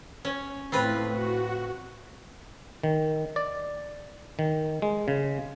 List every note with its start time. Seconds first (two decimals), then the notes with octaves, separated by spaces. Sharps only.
0.25 C#4
0.72 A2 C4 F4 B4
1.08 F#4
2.83 D#3
3.36 D5
4.39 D#3
4.82 G#3
5.08 C#3